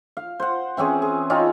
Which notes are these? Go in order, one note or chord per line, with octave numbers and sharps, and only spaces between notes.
F5
C5 F#5
E3 C4 C#4 G#4
G#4
C4 C#4 D#4 F4